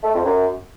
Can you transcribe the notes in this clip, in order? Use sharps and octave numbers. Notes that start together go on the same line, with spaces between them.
A3
F2
F#2